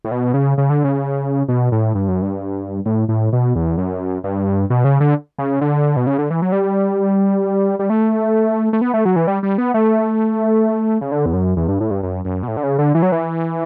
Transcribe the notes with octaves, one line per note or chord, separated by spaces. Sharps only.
A2
B2
C#3
C#3
D3
C#3
B2
A2
G2
F#2
G2
A2
A2
B2
E2
F#2
G2
B2
C#3
D3
C#3
D3
B2
C#3
D3
E3
F#3
G3
G3
A3
A3
B3
A3
F#3
E3
G3
G3
B3
A3
C#3
D3
E2
F#2
E2
G2
A2
G2
F#2
F#2
B2
A2
D3
C#3
D3
E3
F#3
E3